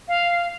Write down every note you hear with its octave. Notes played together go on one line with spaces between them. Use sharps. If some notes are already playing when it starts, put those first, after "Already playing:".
F5